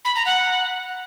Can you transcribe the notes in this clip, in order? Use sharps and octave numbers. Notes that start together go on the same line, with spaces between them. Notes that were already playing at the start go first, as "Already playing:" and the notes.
B5
A#5
F#5